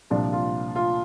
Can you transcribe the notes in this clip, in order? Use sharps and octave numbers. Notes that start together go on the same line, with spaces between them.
C2 A#2 F3 D4
F4
F4